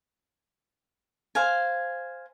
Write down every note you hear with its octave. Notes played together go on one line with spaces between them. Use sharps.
C5 F5 G#5